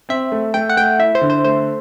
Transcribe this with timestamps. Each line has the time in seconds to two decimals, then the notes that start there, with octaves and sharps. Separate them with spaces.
0.09 C4 E5
0.32 A3
0.54 A3 G5
0.69 F#5
0.77 A3 G5
0.99 E4 E5
1.15 C5
1.21 D3
1.30 C5
1.44 A3 C5